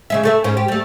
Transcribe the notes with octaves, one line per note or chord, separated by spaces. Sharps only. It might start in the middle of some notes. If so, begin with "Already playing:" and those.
C#3 G#3 E5
A3 A4 E5
G#2 C#4 C5
G4
G3 A3